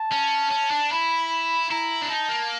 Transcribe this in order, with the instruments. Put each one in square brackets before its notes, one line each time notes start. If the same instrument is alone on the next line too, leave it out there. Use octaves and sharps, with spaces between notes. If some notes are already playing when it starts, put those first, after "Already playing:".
Already playing: [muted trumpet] A5
[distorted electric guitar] C#4
C#4
D4
[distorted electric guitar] E4 [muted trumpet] B5
[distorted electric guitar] E4 [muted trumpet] A#5
[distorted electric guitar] D4
[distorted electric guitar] D#4 [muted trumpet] A5
[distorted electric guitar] A#3